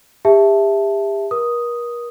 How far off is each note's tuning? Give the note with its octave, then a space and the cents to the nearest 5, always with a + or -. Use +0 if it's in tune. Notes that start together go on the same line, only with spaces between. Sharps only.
G4 +35 E5 +0 A5 +0
A#4 +40 D#6 +0